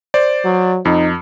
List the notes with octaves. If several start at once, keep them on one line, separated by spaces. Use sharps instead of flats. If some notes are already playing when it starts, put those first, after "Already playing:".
C5 D5
F#3
F2 D#4